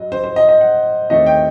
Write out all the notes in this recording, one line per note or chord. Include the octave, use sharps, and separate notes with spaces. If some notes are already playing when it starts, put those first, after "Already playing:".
Already playing: G2 F#3 D#5
C5
C5
D#5
D#5
F#5
D#2 D#3 A3 C4 D#5
G5